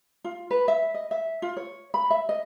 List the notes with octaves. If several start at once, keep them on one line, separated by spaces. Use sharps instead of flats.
F4
B4
E5
D#5
E5
F4
C#5
B5
E5
D#5